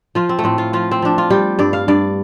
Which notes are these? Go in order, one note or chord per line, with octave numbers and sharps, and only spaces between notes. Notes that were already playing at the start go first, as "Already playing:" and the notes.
F3 F4
C4
A3
A2 C4
F4
F3 F4
C4
F3 D4
F4
G3 G4
G2 D5
F5
G2 D5